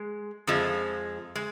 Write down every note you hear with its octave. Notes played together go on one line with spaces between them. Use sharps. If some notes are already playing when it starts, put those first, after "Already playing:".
Already playing: G#3
F2 F3 G#3
G#3